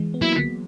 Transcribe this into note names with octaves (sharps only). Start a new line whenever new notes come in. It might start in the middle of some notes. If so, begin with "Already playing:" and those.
Already playing: E3 G#3
B3
F#3 A#3 E4